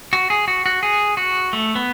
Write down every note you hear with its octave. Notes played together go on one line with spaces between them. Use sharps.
F#4
G#4
F#4
F#4
G#4
F#4
A3
B3